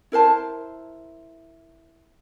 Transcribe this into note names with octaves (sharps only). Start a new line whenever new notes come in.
E4 A#4 C5 A5